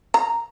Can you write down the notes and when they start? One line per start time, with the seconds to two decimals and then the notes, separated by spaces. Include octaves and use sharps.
0.14 A#5